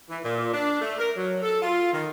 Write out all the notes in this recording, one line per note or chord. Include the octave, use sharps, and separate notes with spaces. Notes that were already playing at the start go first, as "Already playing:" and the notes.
E3
A#2
D4
A3
A#4
F#3
A4
F4
D#3